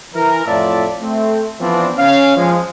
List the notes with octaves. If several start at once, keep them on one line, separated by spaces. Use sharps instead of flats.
E3 A#4
F2 A2 F4 D5 E5 A5
A3 C4
E3 F3 B3 C4 D4
C#4 F5
F3 G#3